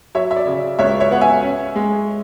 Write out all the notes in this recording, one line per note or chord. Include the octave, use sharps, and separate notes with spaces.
F#3 C#5 E5
E5
D5
C#3
C#2 C#5 E5
C#5 E5
B3 F#5
E5 G#5
C#4
G#3